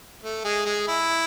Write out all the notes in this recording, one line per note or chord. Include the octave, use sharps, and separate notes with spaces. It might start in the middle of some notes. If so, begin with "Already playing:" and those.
A3
G#3
G#3
E4